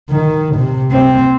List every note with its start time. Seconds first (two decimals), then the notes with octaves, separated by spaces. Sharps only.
0.10 D#3
0.55 C3
0.91 C4